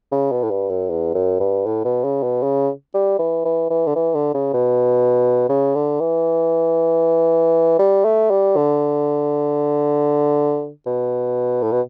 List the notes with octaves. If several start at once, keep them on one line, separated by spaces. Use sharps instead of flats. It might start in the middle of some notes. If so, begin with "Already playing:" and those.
C#3
B2
A2
G2
F#2
E2
F#2
G2
A2
B2
C#3
B2
C#3
G3
E3
E3
E3
D3
E3
D3
C#3
B2
C#3
D3
E3
G3
A3
G3
D3
B2
A2
B2